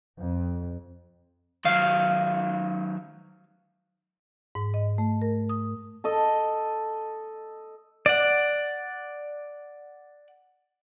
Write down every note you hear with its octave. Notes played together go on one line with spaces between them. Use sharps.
F2
D#3 F#3 F5
G#2
D#5
A3
A#4
D#6
A4 D#5
D5 F#5